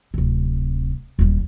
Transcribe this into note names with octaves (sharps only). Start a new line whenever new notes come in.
D1 C3
D#1 G3